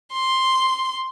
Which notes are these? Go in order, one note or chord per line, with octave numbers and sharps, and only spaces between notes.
C6